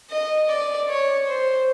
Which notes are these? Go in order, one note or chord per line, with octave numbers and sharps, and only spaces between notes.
D#5
D5
C#5
C5